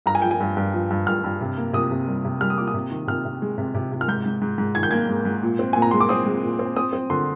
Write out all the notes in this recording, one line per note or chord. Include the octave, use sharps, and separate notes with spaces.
G2 A#5
G#5
F3 G5
G#5
G2
G2
F3
G2
G2 F6
G2
C3
A#3
C3 D#6
C3
G3
C3
G3 F6
D#6
A#3 D6
D#6
C3
D#3
C3 F6
C3
G#3
C3
C3
C3
F6
G#2 G6
G#2
G#2
G#2
D#3 G#6
G6
A#3 G#6
G#2
G#2
A#2
C4
A#2 G#5
A#5
G#3 C6
D6
C4 D#6
G#3
A#2
C4
C4 D#6
C4
D3 C6